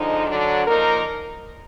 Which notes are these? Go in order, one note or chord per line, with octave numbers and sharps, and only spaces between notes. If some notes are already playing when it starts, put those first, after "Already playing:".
Already playing: D3 F3 G#3 D#4
D3 F#3 D4
F3 A#3 D#4 A#4